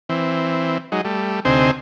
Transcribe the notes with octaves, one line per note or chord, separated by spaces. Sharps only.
E3 C4
F#3 G#3 D#4
G3 A3
D2 C3 C4 D#4 C5 G#5